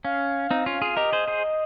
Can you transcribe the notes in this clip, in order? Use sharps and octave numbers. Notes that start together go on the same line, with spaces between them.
C#4 F5
C4 D#4
C#4 F4
F4 G#4
G4 A#4 D#5
G#4 C5
G#4 C5